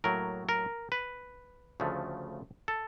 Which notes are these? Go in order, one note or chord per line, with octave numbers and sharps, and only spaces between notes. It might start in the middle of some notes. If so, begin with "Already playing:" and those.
A2 F#3 A#3 A#4
A#4
B4
D2 C#3 F3 A3
A4